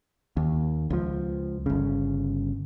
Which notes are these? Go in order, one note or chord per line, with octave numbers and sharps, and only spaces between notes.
D#2
C#2 F3
G1 C#3